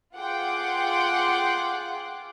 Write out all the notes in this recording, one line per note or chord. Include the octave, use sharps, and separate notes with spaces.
F4 G#4 F#5 G5 C6 D6